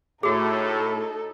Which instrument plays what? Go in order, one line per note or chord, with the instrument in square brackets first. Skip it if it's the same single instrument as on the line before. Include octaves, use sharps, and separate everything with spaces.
[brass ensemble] A2 [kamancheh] D#4 A4 [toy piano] F#4 G#4